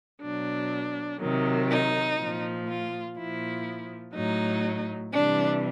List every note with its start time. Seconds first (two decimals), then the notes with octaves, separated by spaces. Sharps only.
0.22 B2 F#3 D4
1.21 C3 D#3 F#3
1.70 D#4
2.19 A#2 F3
2.68 F4
3.16 A#2 F3 E4
4.14 A2 F#3 D#4
5.12 C3 E3 G3 D4